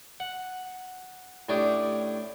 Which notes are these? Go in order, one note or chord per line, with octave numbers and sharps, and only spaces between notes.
F#5
A2 C#4 D4 G4 D#6